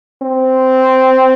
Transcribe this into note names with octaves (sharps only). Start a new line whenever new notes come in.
C4